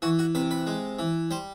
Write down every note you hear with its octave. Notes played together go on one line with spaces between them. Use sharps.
E3 F#4
F#4
C3 B4
B4
G#3
E3
G3 C5